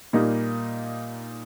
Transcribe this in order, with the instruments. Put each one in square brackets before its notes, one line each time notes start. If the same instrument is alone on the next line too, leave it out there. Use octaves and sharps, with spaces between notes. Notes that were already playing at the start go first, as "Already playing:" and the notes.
[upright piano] A#2 G3 A#3 D#4